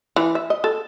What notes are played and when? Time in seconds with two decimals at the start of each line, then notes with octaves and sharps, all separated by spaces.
0.16 E3
0.35 E5
0.50 D#5
0.64 A4